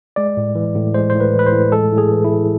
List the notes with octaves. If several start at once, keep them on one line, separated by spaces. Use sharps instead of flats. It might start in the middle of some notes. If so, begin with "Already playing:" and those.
G#3 D5
A2
E3
A2
G#3 C5
A2 C5
B4
E3
B4
C5
A2
G#3 A4
A2
G#4
E3
E4
A2